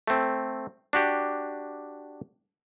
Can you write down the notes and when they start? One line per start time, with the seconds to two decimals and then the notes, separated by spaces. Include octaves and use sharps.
0.08 A3 C4
0.93 D4 F#4 G4